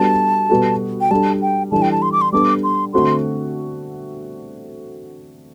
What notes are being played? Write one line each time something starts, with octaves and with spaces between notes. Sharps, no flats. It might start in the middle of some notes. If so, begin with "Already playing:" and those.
Already playing: G3 B3 D4 F#4 A4 A5
B2 G3 B3 F#4 A4
G5
G3 D4 A4 A5
G5
E3 G3 D4 A4 A5
G5
A5
C6
D6
C6
G3 B3 D4 A4 D6
C6
D3 A3 C4 F#4 A4 C6